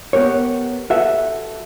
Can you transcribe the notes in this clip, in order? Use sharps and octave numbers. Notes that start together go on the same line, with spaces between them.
B3 G4 A#4 C#5
F#4 G4 A4 B4 E5